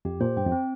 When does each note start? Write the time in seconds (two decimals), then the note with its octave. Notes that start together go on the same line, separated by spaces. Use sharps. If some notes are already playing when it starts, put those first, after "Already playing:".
0.05 F2 G4
0.21 A#2 C5
0.37 G2 G5
0.46 F2
0.52 C4